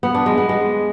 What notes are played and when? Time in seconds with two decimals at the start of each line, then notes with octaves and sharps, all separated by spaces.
0.03 B3
0.15 D4
0.26 G#3
0.38 B3
0.49 G#3